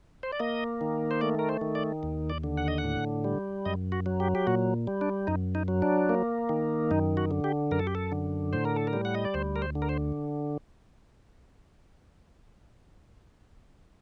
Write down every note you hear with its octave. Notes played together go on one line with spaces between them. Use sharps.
C5
D5
A#3 D#5
D#3
C5
A3 D5
A#4
C5
D#3
D5
D#2
D5
D3
F#5
D#5
F#5
A2
G3
F#2 D#5
F#4
F#3
G4
G4
A#2 F#4
G3
D4
F#2 D#4
D#4
F#3
D4
A#3
D#3
F#2 D#4
F#4
D3
G4
F#2 A#4
A4
G4
A4
D3
A2 C5
A#4
A4
A#4
G3
F#5
D#5
D5
D2 C5
A#4
C5
D3
A#4
C5